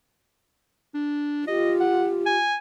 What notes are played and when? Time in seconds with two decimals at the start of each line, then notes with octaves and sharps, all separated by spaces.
0.95 D4
1.47 F4 G4 D#5
1.80 F#5
2.26 G#5